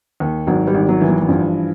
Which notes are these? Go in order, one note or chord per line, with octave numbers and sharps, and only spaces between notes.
D#2
G#1 F#3
G3
G#1
F#3
E3
F#3
F#3
G2 F3